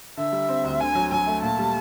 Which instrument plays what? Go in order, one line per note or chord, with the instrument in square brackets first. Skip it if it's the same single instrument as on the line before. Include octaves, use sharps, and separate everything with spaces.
[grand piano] D3 [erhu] E5
[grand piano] G3
C4
D2
[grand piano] D3 [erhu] G#5
[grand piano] F#3
[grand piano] F#3 [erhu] G#5
[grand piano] A3
[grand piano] A#2 [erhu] A5
[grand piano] G3